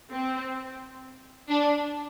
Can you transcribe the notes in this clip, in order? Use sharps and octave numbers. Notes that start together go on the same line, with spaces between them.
C4
D4